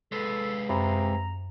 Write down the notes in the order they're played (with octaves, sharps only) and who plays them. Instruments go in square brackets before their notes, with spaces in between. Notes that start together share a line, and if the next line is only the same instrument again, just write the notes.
[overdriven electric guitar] G#3 B4 [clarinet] A4
[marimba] F#2 B5 [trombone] C3 [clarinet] A#5